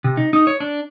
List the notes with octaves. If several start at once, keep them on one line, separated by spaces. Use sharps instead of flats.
C3
D#4
D#4
C#5
D4